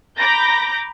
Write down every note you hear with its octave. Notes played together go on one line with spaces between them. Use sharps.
A#5 B5 D6 G6 A#6